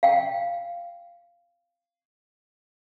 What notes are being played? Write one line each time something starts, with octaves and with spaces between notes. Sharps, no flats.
F5 G5